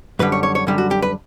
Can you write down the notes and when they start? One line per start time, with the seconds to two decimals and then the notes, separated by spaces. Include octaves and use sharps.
0.19 F#2 D3 G3 B4
0.32 C#5
0.43 C#5
0.55 C#5
0.67 F#2 D3 G3 G4
0.78 F#4
0.91 G4
1.02 B4